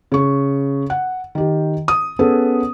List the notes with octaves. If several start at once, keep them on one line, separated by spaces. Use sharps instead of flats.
C#3 C#6
F#5
D#3 G4
D#6
B3 C#4 G#4 A4 B4